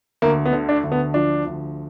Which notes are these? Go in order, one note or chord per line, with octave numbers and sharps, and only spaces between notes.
D2 A#3
B3
D3
D4
D2
B3
F3 D4
D2